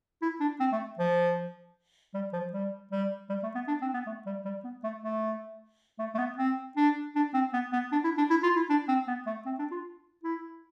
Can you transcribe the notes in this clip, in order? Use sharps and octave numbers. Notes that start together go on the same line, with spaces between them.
E4
D4
C4
A3
F3
G3
F3
G3
G3
G3
A3
B3
D4
C4
B3
A3
G3
G3
B3
A3
A3
A3
A3
B3
C4
D4
D4
C4
B3
B3
D4
E4
D4
E4
F4
E4
D4
C4
B3
A3
C4
D4
F4
E4